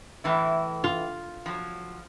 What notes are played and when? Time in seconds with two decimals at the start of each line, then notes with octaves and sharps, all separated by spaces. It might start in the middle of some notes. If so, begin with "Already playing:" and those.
0.24 A2 E3 E4
0.84 F4
1.46 F3 F#3